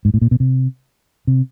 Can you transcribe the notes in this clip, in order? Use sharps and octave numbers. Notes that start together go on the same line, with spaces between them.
G#2
A2
A#2
B2
C3
C3